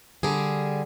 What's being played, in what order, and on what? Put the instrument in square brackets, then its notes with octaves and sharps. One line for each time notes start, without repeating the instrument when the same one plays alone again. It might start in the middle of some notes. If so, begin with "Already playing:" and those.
[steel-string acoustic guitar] D3 G3 G#4